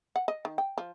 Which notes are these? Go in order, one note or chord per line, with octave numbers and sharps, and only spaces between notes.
F#5
D#5
D#3
G5
F3